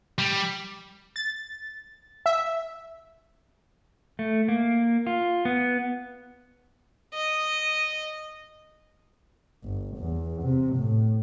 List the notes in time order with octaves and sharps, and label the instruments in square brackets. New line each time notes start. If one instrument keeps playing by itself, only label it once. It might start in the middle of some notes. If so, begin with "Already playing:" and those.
[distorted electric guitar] G3
[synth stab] A6
E5
[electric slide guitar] A3
A#3
F4
B3
[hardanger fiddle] D#5
[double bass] G1
E2
C3
A2